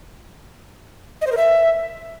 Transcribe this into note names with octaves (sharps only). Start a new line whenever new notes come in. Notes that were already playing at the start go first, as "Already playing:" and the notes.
D#5
C5
A#4
E5